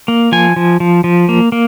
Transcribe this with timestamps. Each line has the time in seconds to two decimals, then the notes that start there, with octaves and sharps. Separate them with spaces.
0.08 A#3
0.32 F3 G#5
0.56 F3
0.80 F3
1.04 F3
1.29 A#3
1.52 A#3